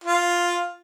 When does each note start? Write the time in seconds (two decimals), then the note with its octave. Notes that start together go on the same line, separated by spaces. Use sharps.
0.04 F4